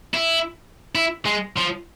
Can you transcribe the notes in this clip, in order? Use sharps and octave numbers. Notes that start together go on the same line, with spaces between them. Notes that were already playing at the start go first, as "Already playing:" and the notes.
E4
E4
G#3
F3